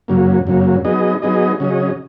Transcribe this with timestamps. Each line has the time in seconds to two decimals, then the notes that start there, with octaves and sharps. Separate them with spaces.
0.08 F#2 C#3 F#3 A#3
0.47 F#2 C#3 F#3 A#3
0.85 F#3 B3 D#4 G#4 D#5
1.22 F#3 B3 D#4 G#4 D#5
1.60 C#3 F#3 C#4 G#4 D#5